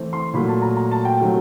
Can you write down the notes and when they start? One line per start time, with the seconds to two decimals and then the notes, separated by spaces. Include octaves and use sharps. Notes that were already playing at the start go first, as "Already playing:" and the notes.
Already playing: E3 A3 C4
0.13 C6
0.34 A#2 F#3 A3 B5
0.49 A5
0.62 A#5
0.77 A#5
0.91 A5
1.05 G5
1.20 C3 D#3 F#3 A3